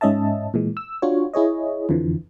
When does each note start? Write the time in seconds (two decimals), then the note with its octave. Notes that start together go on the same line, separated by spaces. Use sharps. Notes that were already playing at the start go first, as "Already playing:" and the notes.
0.01 G#2 C#4 D#5 E5 A5
0.54 A#2 E3 G#3
0.77 E6
1.02 D4 F4 F#4 C#5
1.34 E4 G#4 C#5 D#5
1.89 F2 D3 E3 F3